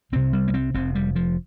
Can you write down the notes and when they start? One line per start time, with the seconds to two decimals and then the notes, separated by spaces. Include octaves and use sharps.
0.12 C2 C3 C4
0.33 G3
0.48 A#3
0.54 C4
0.74 F1 F2 C3 C4
0.95 G3
1.16 F3